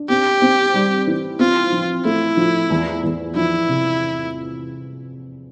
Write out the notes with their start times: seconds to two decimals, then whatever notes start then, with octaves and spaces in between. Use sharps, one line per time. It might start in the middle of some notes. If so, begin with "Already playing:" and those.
Already playing: D4
0.09 C4 G4
0.42 C4
0.74 G3
1.07 E3
1.39 C4 F4
1.72 F3
2.05 A3 E4
2.37 F3
2.70 E2
3.04 E2
3.35 F3 E4
3.69 C3